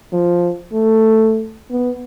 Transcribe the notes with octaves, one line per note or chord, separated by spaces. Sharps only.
F3
A3
B3